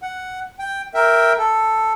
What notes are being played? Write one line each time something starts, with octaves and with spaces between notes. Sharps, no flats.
F#5
G5
A#4 E5 G5
A4